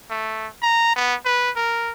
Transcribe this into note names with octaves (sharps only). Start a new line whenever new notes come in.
A3
A#5
B3
B4
A#4